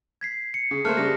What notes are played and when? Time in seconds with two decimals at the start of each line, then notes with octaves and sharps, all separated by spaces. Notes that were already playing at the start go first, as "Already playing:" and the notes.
0.21 G#6 B6 C7
0.54 C#7
0.71 C#3
0.85 A3 A#3 C5 A5 F6 F#6
0.97 C#3 G3 A#6